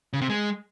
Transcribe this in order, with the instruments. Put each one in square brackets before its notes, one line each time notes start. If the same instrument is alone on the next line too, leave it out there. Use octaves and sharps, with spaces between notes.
[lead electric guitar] C#3
C3
G#3